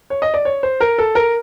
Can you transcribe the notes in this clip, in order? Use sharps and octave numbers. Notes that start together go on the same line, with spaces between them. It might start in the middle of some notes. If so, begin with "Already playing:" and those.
C#5
D#5
D5
C#5
C5
A#4
A4
A#4